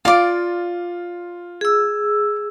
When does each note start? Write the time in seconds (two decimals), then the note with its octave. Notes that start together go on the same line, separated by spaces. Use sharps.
0.05 F4 D5 F5 D6
1.61 G#4 E6